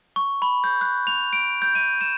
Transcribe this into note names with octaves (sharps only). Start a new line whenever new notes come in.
C#6
B5
G6
F#6
F7
D7
G6
D#7
E7